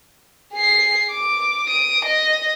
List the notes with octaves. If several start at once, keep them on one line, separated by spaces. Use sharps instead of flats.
G#4 C7
D6
D#6 D7
D#5